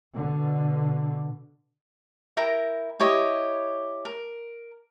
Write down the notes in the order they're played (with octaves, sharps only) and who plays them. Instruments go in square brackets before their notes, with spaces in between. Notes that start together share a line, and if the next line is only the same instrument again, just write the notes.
[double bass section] B2 D3
[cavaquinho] E4 A#4 G5 A#5
E4 G4 C#5 D#5
A#4